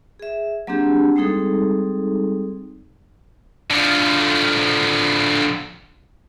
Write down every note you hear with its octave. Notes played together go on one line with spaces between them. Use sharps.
G#4 E5
F#3 A#3 C4 D4 G4 G#4
G3 G#3 C4 D#4 G#4 A4
D3 F3